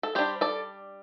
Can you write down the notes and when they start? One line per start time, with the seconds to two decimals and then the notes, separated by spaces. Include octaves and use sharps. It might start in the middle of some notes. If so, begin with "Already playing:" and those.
0.03 A4
0.15 G3 D4 G4 C5
0.41 A4 D5